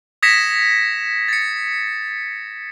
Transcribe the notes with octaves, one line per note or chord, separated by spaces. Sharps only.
D#6 G#6 A#6 B6 C#7 E7
A6 C#7